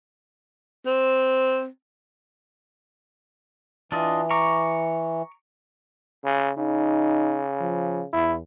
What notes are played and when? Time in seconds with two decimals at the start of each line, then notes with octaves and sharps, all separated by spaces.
0.86 C4
3.92 E3 D4 F4 D#5
4.30 A#5 C#6 D6
6.25 C#3
6.58 C#3 D#4
7.60 F3
8.13 E2 E4